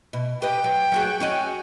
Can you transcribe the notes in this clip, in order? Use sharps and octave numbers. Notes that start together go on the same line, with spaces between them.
B2
G4 B4 D#5 G5
F#3
F#3 F#4 G#4
C#4 F#4 D#5